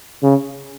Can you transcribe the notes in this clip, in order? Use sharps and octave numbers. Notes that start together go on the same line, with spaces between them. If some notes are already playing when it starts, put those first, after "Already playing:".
C#3